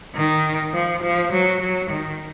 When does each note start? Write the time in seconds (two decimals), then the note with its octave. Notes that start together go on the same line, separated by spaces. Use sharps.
0.16 D#3
0.75 F3
1.03 F3
1.32 F#3
1.61 F#3
1.91 D#3